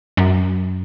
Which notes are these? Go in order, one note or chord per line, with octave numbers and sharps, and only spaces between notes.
F#2